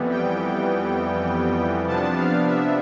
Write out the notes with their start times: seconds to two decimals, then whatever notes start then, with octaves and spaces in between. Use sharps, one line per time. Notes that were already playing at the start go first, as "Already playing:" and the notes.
Already playing: F2 E3 G3 B3
0.11 G5
1.87 C3 F3 B3 D4 A5
2.16 F5
2.47 E5